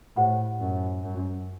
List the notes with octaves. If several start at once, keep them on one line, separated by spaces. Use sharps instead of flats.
A2 G4 C5 F#5 B5
F#2
F#2